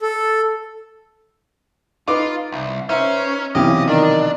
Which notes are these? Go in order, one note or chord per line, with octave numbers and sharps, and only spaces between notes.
A4
D#4 F4 B4 D6
C2
C#4 D#4 B4 C5 E5
B1 C3 E3 C#4 F4 G4 D#5
D#3 D4